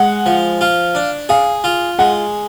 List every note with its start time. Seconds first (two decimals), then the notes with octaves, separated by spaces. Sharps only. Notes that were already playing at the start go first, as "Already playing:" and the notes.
Already playing: G#3 F#5
0.26 F3
0.61 F4
0.95 D4
1.29 G#4 F5
1.64 F4
1.99 G#3 F#5